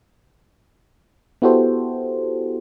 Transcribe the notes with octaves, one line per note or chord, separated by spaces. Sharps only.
B3 E4 F#4 G4 A4 C5